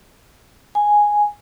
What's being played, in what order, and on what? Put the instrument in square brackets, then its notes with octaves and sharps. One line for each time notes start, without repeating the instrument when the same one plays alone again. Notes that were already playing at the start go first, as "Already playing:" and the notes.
[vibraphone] G#5